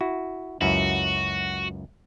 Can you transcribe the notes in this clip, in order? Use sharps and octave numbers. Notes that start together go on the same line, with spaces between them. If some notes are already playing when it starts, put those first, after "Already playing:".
E4 F#4
C#2 F#2 E4 F#4